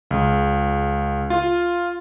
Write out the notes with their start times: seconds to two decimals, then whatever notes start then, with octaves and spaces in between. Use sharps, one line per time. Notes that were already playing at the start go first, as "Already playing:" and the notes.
0.11 C#2
1.30 F4